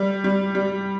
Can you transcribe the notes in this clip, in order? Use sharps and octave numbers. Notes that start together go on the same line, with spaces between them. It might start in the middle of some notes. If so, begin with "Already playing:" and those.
Already playing: G3
G3
G3